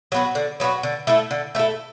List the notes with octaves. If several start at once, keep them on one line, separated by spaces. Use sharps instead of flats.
F#3 B3 F#4
D3
F#3 B3 F#4
D3
A3 E4 A4
D3
A3 E4 A4